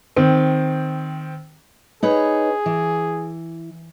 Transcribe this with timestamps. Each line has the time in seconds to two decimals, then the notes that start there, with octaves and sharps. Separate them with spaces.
0.16 D#3 C4
2.03 D#4 G#4 B4 C#5
2.66 E3